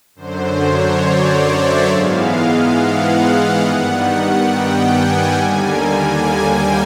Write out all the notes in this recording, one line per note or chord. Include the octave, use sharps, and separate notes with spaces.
F#2 D3 F#3 C5
C#5
D5
D5
E5
G#2 E3 G#3 B3 F5
F#5
G2 D#3 G3 B3
G5
G#5
D#2 D3 G3 A#3 G#5
G#5
G5